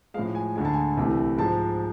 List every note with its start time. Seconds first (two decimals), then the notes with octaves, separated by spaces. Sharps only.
0.14 A2 F3 G#3 F5
0.35 G#5
0.56 D2 D3 G#3 G#5
0.65 A5
0.74 G#5
0.97 C2 C3 E3 A3
1.38 G#2 F3 G#3 A5